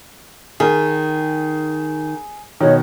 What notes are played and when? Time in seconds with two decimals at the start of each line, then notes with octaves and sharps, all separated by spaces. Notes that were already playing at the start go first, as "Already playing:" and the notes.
0.60 D#3 G#4
2.60 B2 D#3 C#5